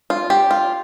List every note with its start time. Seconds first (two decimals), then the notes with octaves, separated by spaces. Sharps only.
0.10 F4
0.30 G4
0.51 F4